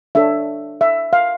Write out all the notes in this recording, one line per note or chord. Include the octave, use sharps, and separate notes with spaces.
D4 A4 C#5 E5
E5
F5